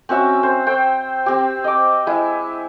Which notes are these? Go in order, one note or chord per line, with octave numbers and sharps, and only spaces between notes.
C4 C#4 F#4 E5
C5
C5 G5
C4 G4
D#5 D6
G#3 E4